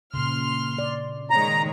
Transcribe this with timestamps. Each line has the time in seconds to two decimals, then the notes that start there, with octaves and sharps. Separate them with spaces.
0.14 A#2 C#3 C6 F6
0.78 D5
1.30 D#3 G#3 C#5 A#5